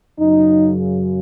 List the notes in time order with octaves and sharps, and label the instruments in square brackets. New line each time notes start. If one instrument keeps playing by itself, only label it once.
[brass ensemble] F#2 C#3 F#3 D#4